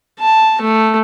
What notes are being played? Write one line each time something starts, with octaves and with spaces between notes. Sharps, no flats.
A5
A3